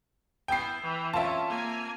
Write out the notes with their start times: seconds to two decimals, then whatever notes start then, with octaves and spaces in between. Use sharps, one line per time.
0.48 B3 E4 G5 C7
0.82 E3
1.13 C4 C#4 F4 E5 A5
1.49 A#3 G#5